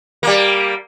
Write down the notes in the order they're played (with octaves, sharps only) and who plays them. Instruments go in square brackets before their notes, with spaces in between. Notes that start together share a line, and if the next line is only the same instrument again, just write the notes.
[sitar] G3 A#3